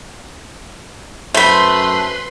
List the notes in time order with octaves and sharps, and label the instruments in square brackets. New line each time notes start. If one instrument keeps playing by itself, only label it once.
[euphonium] F#2 [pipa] A3 [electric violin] B4 C6 [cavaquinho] C5 B5